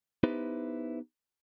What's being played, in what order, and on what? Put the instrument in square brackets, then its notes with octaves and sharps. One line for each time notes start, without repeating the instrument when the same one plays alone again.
[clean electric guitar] B3 D#4 E4 G4 B4 C5